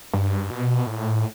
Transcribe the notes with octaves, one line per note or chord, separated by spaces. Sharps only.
G2
B2
A2